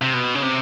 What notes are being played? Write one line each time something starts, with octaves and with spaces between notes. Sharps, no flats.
C3
B2
C#3
C3